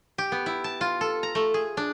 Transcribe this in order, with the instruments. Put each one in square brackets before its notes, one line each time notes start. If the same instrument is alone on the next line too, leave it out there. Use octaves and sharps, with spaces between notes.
[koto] G4
B3
E4
A5
F4
A4
A#5
A3
G#4
D4